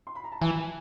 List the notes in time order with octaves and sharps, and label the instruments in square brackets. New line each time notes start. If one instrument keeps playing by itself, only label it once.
[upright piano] C6
B5
A#5
A5
[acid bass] E3 [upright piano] G#5